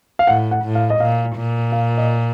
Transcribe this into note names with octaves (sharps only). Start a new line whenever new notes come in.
F5
A2 F#5
F#5
A2
F5
D#5
A#2 F5
A#2
F5
D#5